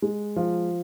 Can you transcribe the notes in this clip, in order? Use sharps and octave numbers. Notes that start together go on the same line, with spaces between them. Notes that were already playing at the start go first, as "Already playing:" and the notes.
G#3
F3